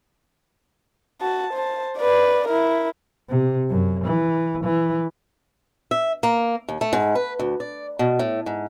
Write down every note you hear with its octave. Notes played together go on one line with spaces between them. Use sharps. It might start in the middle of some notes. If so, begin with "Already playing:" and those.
F#4 A5
C5 A5
B4 D5
E4 A#4
C3
F#2
E3
E3
E5
A#3
D#2
A3
G#2
B4
D2
D5
B2
A2
G#2